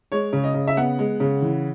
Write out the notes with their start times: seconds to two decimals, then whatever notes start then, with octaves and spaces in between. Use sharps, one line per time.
0.12 G#3 C#5
0.33 C#3
0.44 D#5
0.54 C#3
0.68 E5
0.77 B3 F#5
0.99 G#3
1.20 C#3
1.42 E3